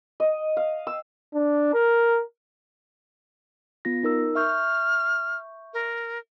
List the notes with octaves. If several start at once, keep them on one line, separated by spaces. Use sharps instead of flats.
D#5
F5
E6
D4
A#4
B3 F4 A#6
D#4 A#4 E6
E5 C#6 F6 G6
A#4